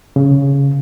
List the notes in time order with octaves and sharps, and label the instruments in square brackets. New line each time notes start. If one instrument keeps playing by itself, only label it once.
[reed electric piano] C#3